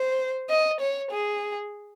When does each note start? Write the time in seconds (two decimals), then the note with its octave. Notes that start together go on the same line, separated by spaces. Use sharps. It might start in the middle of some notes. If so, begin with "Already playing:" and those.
Already playing: C5
0.49 D#5
0.80 C#5
1.11 G#4